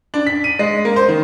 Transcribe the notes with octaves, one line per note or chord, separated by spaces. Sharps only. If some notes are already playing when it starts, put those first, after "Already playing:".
D4
B6
D#7
G#3
A#3
C5
D#3